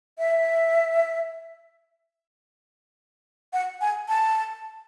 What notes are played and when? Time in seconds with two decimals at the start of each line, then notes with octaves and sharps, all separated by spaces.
0.18 E5
3.53 F#5
3.81 G#5
4.09 A5